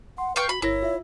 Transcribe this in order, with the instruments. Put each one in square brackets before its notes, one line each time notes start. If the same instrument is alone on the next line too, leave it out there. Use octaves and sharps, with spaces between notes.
[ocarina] F#5 [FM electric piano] C6
[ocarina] B4 [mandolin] F5 G5 C#6
[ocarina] F#4 [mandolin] B5
[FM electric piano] G1 A#4 A#6 [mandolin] E4 [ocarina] C#5
[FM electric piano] F4 E5